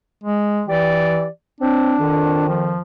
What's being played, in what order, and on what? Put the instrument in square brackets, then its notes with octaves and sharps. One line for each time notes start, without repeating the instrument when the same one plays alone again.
[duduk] G#3
[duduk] E3 [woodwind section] G4 D5
[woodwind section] C4 [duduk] D4
[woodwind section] F2 D#3
[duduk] F3